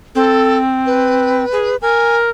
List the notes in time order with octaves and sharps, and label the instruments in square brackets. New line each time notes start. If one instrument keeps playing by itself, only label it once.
[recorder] C4 [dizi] A4
[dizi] B4
[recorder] G#4
[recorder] A#4 [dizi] G#5